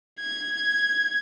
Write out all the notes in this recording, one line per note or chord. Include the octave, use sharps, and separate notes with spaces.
G#6